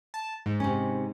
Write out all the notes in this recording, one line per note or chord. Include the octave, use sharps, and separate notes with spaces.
A5
G#2
C3 C#4